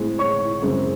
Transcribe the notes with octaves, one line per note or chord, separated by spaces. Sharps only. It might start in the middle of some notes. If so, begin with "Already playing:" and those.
Already playing: A2 G#3 C4
C#5 C#6
F#2 C#3 G#3 C4